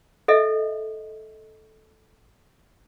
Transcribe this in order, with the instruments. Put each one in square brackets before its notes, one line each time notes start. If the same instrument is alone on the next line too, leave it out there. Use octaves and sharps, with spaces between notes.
[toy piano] A4 D#5 E5